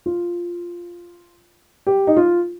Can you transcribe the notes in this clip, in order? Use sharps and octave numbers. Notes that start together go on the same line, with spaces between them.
F4
G4
D#4
F4